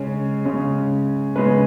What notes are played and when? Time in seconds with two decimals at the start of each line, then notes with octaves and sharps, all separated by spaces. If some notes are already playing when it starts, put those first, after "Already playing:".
Already playing: C#3 G#3 C#4 C#5
0.45 C#3 G#3 C#4
1.36 C#3 G#3 C#4 B4